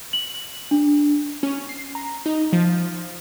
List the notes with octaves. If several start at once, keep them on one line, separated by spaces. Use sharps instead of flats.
F#7
D4
C#4
C7
A#5
D#4
F3